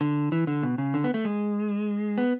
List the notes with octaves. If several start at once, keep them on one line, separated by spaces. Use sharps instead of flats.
D3
E3
D3
B2
C#3
D3
B3
A3
G#3
B3